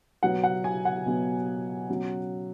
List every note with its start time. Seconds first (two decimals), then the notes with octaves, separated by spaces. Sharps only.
0.23 B2 F#3 B3 F#5
0.44 F#5
0.64 G#5
0.85 F#5
1.06 B2 F#3 B3
1.88 B2 F#3 C#4